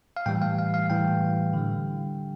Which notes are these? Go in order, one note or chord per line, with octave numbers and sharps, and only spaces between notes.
F5
A2 E3 G3 G5
F5
F5
F5
A2 E3 G3 G5
D3 G3